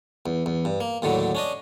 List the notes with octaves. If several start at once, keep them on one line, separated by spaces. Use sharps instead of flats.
E2
E2
G2
A#3
D#2 A2 D3 F#3
C#4 D4 D#5